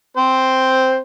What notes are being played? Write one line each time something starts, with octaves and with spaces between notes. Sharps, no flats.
C4 C5